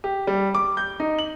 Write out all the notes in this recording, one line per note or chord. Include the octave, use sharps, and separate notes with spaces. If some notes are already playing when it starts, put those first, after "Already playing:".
G4
G3
D6
G6
D#4
F#7